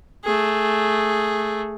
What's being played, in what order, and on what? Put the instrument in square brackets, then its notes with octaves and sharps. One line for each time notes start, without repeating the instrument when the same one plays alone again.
[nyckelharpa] A3 G#4